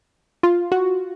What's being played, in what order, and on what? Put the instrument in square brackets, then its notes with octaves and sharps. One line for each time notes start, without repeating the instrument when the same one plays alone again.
[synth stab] F4
F#4